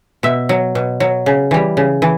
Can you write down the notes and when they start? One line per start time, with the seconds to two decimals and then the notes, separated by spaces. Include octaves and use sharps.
0.23 B2 E5
0.49 F#3
0.75 B2
1.00 F#3
1.26 C#3
1.51 E3 G3
1.77 C#3
2.02 E3